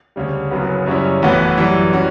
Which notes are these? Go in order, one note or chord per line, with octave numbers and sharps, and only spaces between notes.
D2 C#3 G3
F#1 F#2 C#3 F#3 B3
F#2 C#3 G3 C#4 E4
A1 A2 E3 B3 F#4
F#2 E3 G3
G3 C#4 F#4